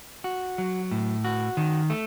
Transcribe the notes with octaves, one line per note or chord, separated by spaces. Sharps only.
F#4
F#3
A2
F#4
D#3
A3